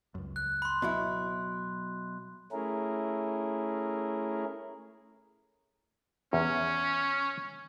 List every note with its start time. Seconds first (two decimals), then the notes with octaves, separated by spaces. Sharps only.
0.15 C#2 F#2
0.36 F#6
0.62 B5 C6
0.82 B2 F#3 E4
2.52 A3 C#4 E4 G#4 A#4
6.33 E2 C#4